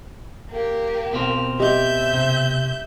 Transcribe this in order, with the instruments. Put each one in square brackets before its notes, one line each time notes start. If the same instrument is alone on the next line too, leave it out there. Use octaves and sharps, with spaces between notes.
[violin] A#3 G4
[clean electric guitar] B2 C4 F4
[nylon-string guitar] G4 D#5 [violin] E5 G6
[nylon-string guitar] C3